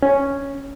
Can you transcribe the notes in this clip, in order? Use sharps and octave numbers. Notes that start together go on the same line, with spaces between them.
C#4